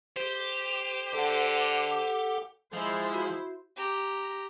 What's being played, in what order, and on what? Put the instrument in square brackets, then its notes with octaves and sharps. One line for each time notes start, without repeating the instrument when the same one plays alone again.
[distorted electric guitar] G4 [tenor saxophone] C5
[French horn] D3 [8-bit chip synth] A4 F#5
[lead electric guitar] F3 [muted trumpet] G#3 [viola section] E4 C5
[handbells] F#4
[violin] G4 A#5